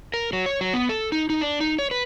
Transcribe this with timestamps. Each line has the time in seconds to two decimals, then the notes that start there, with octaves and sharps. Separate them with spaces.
0.14 A#4
0.33 F#3
0.46 C#5
0.61 F#3
0.74 B3
0.89 A4
1.12 D#4
1.30 D#4
1.41 D4
1.60 D#4
1.79 C#5
1.91 B4